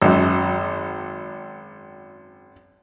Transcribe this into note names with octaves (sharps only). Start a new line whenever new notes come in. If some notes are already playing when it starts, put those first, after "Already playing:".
G#1 F#2